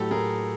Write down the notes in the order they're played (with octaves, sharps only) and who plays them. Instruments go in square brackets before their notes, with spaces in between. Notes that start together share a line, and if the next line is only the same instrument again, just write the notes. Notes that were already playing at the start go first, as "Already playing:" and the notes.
Already playing: [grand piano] A2 F#3 G4 A4
A2 G#4 A#4